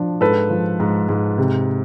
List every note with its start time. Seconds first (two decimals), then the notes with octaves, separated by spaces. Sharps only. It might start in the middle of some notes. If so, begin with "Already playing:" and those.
Already playing: F3 D4
0.21 G#2 A4 B4
0.50 F3
0.80 G#2
1.09 G#2
1.38 C3